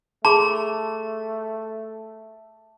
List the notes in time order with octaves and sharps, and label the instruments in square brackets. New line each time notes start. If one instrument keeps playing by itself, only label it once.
[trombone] A3 [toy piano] G#4 B5 C6 [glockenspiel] A5